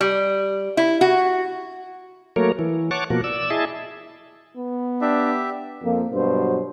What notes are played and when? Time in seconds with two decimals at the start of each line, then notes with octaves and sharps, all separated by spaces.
0.01 G3
0.77 E4
1.01 F#4
2.36 F#3 A3 A#3 A#4 C#5
2.59 E3
2.91 C#5 F#5 A5 C#6 D6
3.10 B2 F3 A#3 F#4
3.24 D5 E6
3.50 E4 G#4 D#5 E5 A5
4.57 B3
5.01 D4 G4 E5
5.82 F2 F3 A#3
6.12 G2 B2 F#3 C5